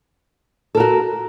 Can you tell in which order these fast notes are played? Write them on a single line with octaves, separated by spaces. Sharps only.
A4 A#4 F#4